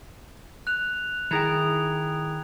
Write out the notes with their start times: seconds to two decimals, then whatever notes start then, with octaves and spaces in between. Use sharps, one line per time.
0.67 F#6 F7
1.31 D#3 E4 G#4 G5 A#5 G#6 F7